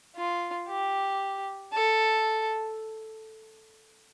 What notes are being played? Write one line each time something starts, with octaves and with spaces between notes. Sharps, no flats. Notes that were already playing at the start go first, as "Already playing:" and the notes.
F4
G4
A4